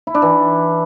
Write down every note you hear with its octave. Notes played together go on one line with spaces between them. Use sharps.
E4
D4
E3